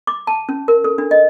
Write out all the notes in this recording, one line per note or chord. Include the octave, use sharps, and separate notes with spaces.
D6
A5
C#4
A#4
A4
D4
D#5